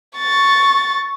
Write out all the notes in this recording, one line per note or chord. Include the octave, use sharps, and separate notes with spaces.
C#6 A6